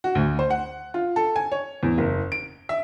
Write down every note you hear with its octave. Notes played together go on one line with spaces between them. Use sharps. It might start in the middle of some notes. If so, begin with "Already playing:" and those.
F#4
D2
C5
F#5
F4
A4
G#5
C#5
E2
F#1
D7
E5